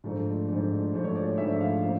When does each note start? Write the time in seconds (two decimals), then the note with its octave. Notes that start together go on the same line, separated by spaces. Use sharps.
0.04 G#2 F3 A3 D4
0.48 G#2 F3 A3 D4
0.92 G#2 F3 A3 D4 C5
1.04 C#5
1.15 D5
1.27 D5
1.38 G#2 F3 A3 D4 E5
1.61 F5
1.83 C#3 F3 A#3